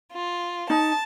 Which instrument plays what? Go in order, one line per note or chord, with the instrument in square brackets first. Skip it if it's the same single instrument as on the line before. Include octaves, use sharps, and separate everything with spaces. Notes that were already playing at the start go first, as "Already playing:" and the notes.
[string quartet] F4
[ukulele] D#4 [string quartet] A5